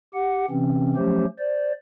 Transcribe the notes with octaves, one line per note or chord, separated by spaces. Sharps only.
G4 F#5
C3 E3 C4 C#4
F3 F#3 A3 C#4 G4 C5
C5 D5